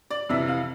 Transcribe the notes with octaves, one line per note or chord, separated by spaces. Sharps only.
D5
F2 C3 E3 E5
F5